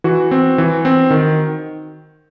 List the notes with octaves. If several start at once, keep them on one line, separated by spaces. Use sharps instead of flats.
E3 F#4
C4
E3
C4
D#3